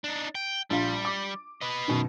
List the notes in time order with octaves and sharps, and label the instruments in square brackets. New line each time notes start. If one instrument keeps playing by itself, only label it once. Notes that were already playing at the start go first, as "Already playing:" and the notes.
[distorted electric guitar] D4 D#4
G5
[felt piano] A#1 F4 [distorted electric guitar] G3
[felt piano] D6
[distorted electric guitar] B4 D#5
[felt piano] F#2 B2 D#3